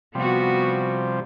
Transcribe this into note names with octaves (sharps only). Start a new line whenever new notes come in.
C3 F3 G3 B3 F#4